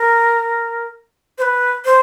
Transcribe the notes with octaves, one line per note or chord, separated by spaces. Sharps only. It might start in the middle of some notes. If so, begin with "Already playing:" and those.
Already playing: A#4
C5
B4
C5